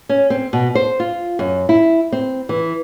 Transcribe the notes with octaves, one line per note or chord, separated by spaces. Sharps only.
C#4
C4
B2
C5
F4
F#2
E4
C4
E3